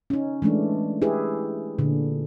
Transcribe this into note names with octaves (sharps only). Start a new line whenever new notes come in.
C#4 D#4
E3 G#3 A3 D4
E4 G4 G#4 B4
A#2 D3